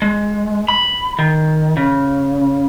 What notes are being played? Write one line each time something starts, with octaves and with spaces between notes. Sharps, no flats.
G#3
B5
D#3
C#3